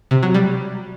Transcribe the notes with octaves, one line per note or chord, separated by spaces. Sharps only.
C3
F#3
G3